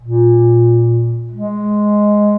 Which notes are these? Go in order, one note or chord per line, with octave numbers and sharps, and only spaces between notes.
A#2
G#3